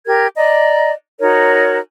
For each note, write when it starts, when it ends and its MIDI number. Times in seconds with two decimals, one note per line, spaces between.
0.05 0.26 67
0.05 0.26 70
0.05 0.26 92
0.36 0.91 74
0.36 0.91 75
0.36 0.91 82
1.20 1.79 63
1.20 1.79 66
1.20 1.79 70
1.20 1.79 73